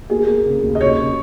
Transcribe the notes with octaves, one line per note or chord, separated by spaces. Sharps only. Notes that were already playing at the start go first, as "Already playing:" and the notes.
A#3 G#4
A#3
C#3
D#2
D#5
C#3 C#5
C#3